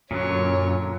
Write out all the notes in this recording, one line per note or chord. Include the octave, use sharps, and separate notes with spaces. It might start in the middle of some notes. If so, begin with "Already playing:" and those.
F#2 A#2 D3 F#3 C#5